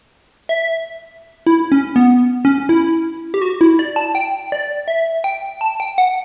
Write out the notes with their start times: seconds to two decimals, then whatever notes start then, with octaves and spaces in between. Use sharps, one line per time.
0.49 E5
1.47 E4
1.72 C#4
1.96 B3
2.45 C#4
2.69 E4
3.34 G4
3.41 F#4
3.61 E4
3.79 D5
3.96 A5
4.15 G5
4.52 D5
4.88 E5
5.24 G5
5.61 A5
5.80 G5
5.98 F#5